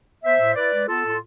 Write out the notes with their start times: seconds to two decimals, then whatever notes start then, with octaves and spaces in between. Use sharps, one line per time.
0.24 B3 C5 E5
0.40 A2
0.56 E4 B4 D5
0.73 G#3
0.88 B3 F4 A4
1.04 A2
1.09 F4